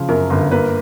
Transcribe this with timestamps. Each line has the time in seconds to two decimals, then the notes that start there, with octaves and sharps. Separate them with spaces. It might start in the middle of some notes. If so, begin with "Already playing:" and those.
Already playing: C#3 F3
0.09 F#2 A#4
0.30 G1
0.51 A#3 B4